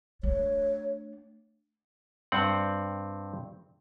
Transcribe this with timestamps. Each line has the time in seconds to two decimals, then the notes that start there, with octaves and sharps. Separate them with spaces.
0.23 A3 D4 C#5
2.32 G2 C4 F#5